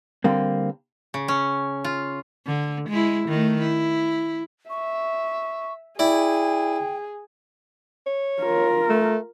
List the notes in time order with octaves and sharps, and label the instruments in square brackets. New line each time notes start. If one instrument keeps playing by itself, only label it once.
[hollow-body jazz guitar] D3 G3 A#3 C4
[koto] C#3
C#4
F4
[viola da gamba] D3
G#3 E4
D#3 A3
E4
[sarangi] E5 [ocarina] C#6
[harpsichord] E4 D5 [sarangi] G#4 [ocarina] G5
[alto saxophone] C#5
[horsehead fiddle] F4 A#4
[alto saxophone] A3